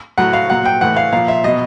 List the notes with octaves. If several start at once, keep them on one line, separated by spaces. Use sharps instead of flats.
A2 F#3 F#5
F5
A#2 F#3 F#5
G5
A2 E3 F#5
F5
A#2 F3 F5
E5
B2 F#3 D#5